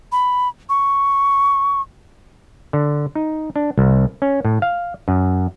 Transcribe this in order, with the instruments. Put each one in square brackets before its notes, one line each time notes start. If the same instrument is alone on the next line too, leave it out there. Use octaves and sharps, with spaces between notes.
[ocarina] B5
C#6
[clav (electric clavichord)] D3
D#4
D4
C2
C#4
A2
F5
F#2